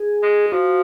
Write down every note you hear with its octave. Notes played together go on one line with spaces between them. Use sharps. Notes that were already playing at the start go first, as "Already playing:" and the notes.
Already playing: G#4
G#3
F3 F#4